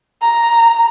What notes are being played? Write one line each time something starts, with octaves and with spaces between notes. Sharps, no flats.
A#5